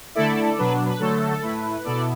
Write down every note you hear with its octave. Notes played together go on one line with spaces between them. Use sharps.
D3 A3 E4 A4 D5
B2 F#3 D4 B4
B4
D3 F#3 A3 A4
A2 A3 E4 B4
B2 B3 E4 A4 D5